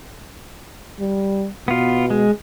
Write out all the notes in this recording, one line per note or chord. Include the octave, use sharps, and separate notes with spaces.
G3
B2 B3 F4
G#3